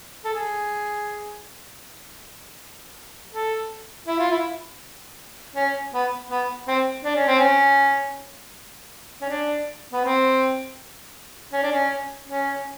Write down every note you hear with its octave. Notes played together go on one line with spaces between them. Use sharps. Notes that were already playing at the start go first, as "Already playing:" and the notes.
A4
G#4
A4
E4
F4
E4
C#4
B3
B3
C4
D4
C#4
C4
C#4
C#4
D4
B3
C4
C#4
D4
C#4
C#4